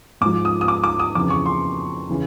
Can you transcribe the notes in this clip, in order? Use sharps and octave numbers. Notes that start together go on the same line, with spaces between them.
G#2 F3 D6
D#6
D#6
D6
D6
D#6
F2 C#3 E3 D6
C#6
C6
C#3 E3